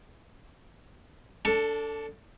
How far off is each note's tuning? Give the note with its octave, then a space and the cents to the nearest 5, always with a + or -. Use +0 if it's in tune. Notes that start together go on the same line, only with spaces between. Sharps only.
D4 -20 A4 +15